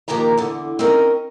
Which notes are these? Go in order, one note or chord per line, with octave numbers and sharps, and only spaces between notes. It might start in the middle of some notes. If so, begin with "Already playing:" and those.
D#3 F3 A#3 D4 G4 A#5
E2 D3
C4 C#4 D#4 A#4